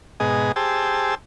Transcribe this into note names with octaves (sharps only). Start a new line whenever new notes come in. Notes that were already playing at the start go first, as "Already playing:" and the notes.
G#2 B2 G#4 D#5
G4 G#4 C5 A5 E6